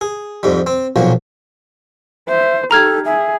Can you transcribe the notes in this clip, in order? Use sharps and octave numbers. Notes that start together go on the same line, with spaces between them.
G#4
F2 G#2 G3
C4
B1 A#2 F3 F#3
C5 E5
D#4 G4 A4 A#5 F6 G#6
G#4 E5